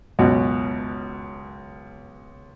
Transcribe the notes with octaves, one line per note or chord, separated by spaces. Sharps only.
C#2 F#2 B2 F#4